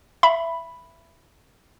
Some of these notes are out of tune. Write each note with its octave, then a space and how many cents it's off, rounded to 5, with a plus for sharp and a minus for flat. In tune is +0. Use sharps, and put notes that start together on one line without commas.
E5 +15 B5 +0